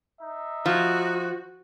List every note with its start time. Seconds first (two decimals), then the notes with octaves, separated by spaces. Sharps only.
0.21 D#4 E5
0.66 F3 F#4